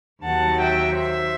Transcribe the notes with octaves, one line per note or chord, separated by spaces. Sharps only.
D#2 D#3 F#3 F#5 A5
E5 G5
C5 E5